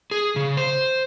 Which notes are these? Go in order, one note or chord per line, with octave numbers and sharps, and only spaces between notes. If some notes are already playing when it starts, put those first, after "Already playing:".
G#4
C#3
C5